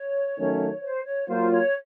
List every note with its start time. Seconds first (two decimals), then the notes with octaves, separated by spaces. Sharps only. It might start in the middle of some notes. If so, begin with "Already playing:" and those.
Already playing: C#5
0.38 D#3 F#3 A3 C#4
0.83 C5
1.05 C#5
1.28 F#3 A#3 F4 C5
1.51 C#5